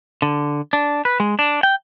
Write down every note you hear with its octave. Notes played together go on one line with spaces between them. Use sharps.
D3
D4
B4
G#3
D4
G5